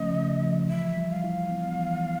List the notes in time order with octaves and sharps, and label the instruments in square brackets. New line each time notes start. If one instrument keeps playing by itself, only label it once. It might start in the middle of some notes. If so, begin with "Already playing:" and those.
Already playing: [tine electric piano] C#3 F3 A3 C#4 [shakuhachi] D#5
[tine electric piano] C#3
F3
[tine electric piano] E3 [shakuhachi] E5
[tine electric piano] G3
[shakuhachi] F5
[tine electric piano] E4
B3
E3